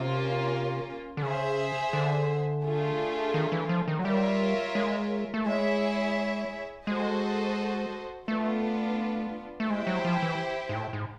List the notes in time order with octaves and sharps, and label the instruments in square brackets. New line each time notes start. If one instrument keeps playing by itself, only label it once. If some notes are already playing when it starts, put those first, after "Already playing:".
Already playing: [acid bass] C3 [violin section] A#3 C#4 F4
[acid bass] D3
[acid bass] C#3 [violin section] G#4 C5 E5
[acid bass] D3
[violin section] A3 D4 F4 G#4
[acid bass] D#3
E3
F3
D#3
F#3
[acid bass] G3 [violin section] F4 A#4 C#5 E5
[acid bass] G#3
A3
[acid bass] G#3 [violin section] E4 G#4 C#5 E5
[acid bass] G#3 [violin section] F#4 A4 C5 D#5
[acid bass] A3 [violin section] B3 D4 F4
[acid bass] A3
[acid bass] G#3 [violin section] E4 G4 C5 E5 G5
[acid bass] F#3
F3
E3
G#2
A2
G#2